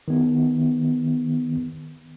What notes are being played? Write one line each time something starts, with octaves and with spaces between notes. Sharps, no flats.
D#3 B3